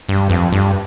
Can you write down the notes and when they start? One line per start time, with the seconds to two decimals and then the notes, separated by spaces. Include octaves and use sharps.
0.09 G2
0.30 F2
0.52 G2